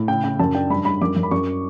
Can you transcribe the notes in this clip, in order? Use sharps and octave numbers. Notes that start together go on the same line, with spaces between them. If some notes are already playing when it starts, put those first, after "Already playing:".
Already playing: A2
C#3 G5
C#3 G5
F#2 A5
D4 G5
G2 B5
G2 B5
F#2 D6
F#2
B5
F#2 C#6